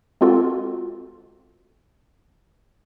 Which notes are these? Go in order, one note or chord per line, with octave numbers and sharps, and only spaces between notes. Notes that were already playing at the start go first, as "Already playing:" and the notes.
G#3 C4 F4 F#4 A4